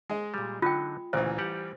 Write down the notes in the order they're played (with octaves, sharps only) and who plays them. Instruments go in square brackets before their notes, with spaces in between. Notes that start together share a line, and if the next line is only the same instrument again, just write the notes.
[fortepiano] G#3 G#4 D#5
[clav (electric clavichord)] A#2 G3
[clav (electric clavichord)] D3 F#3 D#4 [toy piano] F4 G5
[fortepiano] A1 E3 [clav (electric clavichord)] D2 A#2 C#3 [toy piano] C5
[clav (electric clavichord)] G3 G4 F#5